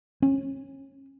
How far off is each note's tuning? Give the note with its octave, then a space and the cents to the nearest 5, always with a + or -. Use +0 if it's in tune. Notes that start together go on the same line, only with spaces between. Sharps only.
C#4 -30